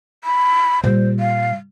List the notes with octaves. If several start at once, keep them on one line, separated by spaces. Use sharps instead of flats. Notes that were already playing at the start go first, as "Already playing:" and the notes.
B5
A#2 G3 C5
F5